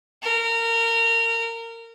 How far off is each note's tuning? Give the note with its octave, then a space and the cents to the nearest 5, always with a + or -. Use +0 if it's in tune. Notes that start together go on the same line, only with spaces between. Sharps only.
A#4 -25